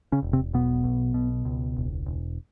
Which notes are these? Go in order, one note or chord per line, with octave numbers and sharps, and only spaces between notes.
C#3 C#4
E1
C3 C4
B1 B2 B3
B1
B2
C#2
E1
E1